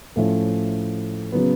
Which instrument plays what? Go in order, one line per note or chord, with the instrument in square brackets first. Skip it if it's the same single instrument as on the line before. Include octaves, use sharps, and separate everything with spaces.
[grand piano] A2 F3 A3 C#4 E4
C#3 F#3 B3